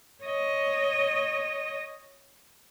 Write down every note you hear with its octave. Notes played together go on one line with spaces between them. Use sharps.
C#5 D#5